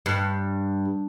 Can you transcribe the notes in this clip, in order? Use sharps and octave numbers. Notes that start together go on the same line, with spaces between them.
G2